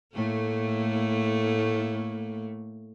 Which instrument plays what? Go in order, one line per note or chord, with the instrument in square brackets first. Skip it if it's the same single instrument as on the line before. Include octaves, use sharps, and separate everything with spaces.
[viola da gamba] A2 A3 A#3